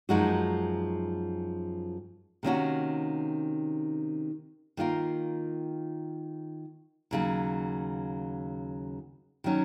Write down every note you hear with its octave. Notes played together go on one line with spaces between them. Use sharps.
F#2 F3 G#3 D#4 F#4
C3 D#3 A#3 C#4 F#4
D#3 A#3 F4 A#4
D#2 C#3 F#3
D#3 F#3 C#4